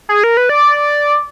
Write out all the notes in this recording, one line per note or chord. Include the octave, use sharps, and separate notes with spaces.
G#4
A#4
B4
D5